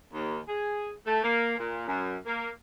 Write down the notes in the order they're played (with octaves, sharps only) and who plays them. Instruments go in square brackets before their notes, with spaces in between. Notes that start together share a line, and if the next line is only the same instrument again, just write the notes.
[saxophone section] D#2
G#4
A3
A#3
A#2
F#2
A#3